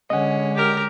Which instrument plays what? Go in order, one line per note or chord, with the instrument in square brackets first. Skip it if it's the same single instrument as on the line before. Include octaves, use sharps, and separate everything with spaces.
[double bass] D3 G#3 [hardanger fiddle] C#4 [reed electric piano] D#5 F#5
[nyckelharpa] G4 A#4